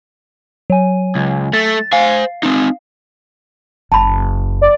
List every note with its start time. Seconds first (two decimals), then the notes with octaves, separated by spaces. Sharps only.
0.70 F#3 G#5
1.15 C#2
1.53 A3 A6
1.93 C5 F5 G#5
2.43 C4 D#4
3.92 F#1 A5 B5
4.62 D5